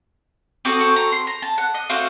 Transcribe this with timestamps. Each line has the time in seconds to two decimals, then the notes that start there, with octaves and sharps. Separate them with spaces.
0.65 C4 F#4 A4 D#6
0.81 C#6
0.96 A#5
1.12 C6
1.27 A#5
1.42 A5
1.58 F#5
1.74 D#5
1.89 A3 C4 F#4 A4 F5